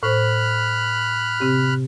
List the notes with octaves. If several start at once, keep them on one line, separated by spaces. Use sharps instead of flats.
A2 C5 B5 F6 F#6
C3 C4 G4